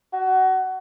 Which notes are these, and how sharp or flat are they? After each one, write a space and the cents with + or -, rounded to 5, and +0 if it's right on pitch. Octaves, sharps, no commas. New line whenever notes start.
F#4 +20